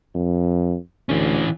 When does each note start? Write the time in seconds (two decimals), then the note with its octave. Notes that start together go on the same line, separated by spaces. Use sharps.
0.14 F2
1.09 D2 E3 C#4